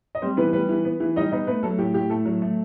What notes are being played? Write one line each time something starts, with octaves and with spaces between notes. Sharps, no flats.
D#5
G3 C4 C5
E3 B3 B4
G3 B3 B4
E3
B3
E3
G3 D#4 D#5
B3 D#4 D#5
A3 B3 B4
F#3 A3 A4
A2 G4
A2 G4
A2 A3 A4
F#3
A3